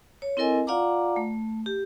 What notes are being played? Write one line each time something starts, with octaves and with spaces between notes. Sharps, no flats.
C#5
C4 E4 A4 A#4 D#5 G#5
F4 D5 F5 F#5 A#5 D6
A3
G4